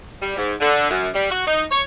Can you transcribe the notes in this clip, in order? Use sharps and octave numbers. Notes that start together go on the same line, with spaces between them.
G3
G#2
D3
F#2
G3
F#4
D#4
C#5